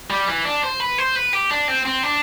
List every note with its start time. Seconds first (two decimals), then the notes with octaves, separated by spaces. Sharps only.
0.10 G3
0.28 E3
0.45 D4
0.63 C5
0.80 B4
0.98 C5
1.16 B4
1.33 G4
1.51 D4
1.68 C4
1.86 C4
2.04 D4